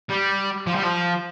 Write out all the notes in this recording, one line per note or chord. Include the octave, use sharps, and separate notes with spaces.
G3
F3
G3
F3